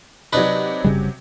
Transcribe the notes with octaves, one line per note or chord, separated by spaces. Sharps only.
C3 F#3 D4 D#4 B4
F#1 C#3 G3